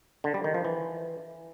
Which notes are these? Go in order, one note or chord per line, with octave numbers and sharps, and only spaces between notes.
D3
G3
D#3
F3
E3